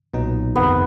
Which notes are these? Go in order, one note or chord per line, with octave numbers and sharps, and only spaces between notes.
B1 A#2 F#3 B3 D#4
G1 F2 C3 D#3 B3